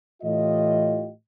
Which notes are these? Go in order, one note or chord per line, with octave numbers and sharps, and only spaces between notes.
A2 E3 F4 G4 D#5